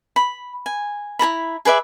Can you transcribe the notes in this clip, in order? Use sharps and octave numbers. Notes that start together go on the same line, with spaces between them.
B5
G#5
E4 A4 A#5 B5
G#4 B4 D5 E5